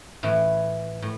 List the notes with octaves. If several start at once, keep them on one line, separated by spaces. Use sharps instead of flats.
A2 E3 E4
A2